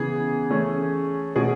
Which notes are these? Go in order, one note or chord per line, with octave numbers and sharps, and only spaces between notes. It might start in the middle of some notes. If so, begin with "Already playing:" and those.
Already playing: C#3 E3 B3 G#4
E3 A3 C#4
B2 A3 C#4 G#4